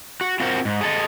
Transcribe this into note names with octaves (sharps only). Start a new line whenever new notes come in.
F#4
C4 F4 F#4 A#4 C5
G#2
G#4 A4 D#5